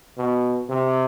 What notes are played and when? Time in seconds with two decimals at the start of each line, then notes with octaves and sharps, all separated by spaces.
0.18 B2
0.69 C3